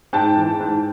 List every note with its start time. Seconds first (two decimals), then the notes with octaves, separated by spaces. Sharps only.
0.13 G#2 G5 A5
0.37 E3
0.60 G#2